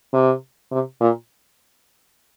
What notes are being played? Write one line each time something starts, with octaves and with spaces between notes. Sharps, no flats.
C3
C3
A#2